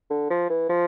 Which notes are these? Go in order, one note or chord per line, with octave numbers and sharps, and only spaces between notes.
D3
F3
E3
F3